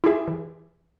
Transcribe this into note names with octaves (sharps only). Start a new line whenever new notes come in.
E4 F4 G4 G#4 E5
E3